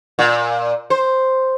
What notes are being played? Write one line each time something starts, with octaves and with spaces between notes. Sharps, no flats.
A#2
C5